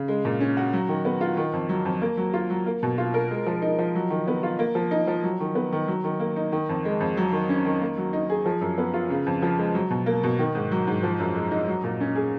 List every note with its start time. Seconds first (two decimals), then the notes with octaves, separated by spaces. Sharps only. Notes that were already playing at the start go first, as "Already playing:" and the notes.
Already playing: C#3
0.08 G#3
0.25 A#2
0.40 C#4
0.57 F#4
0.73 F#3
0.88 D#3
1.05 B3
1.21 F4
1.37 D#3
1.53 F2
1.69 F#3
1.85 F2
2.02 A#3
2.17 F#3
2.33 F4
2.50 F#3
2.66 A#3
2.83 B2
2.98 F4
3.14 A#4
3.31 G#3
3.46 F3
3.62 D#4
3.78 F3
3.95 F#3
4.10 D#3
4.27 B3
4.43 F4
4.59 A#3
4.75 F3
4.91 D#4
5.07 F3
5.23 F#3
5.40 D#3
5.55 B3
5.72 D#3
5.88 F#3
6.04 D#3
6.20 A#3
6.36 D#4
6.52 D#3
6.69 F2
6.85 G#3
7.00 F2
7.17 F#3
7.32 D#3
7.49 C#4
7.65 D#3
7.81 A#3
7.98 F#3
8.13 D#4
8.29 G#4
8.45 F3
8.61 F#2
8.78 B3
8.94 F4
9.10 C#3
9.26 F2
9.42 F3
9.58 G#3
9.74 F#3
9.90 B2
10.06 A#3
10.23 B2
10.39 D#3
10.55 G#2
10.71 F#3
10.87 G#2
11.03 F3
11.19 F#2
11.35 G#3
11.51 D#4
11.68 F#3
11.84 A#2
12.00 C#4
12.15 G#4